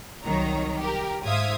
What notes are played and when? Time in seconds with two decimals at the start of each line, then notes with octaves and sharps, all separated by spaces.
0.24 C2 D#3 F#3 C#5 A#5
0.78 G4 A#4
1.24 G#2 C5 E5 F5 D#6 G#6